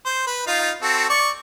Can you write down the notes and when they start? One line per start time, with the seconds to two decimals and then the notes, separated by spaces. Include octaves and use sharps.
0.06 C5
0.27 B4
0.47 D#4 F4 F5
0.82 C4 F#4 A4
1.09 D5 C#6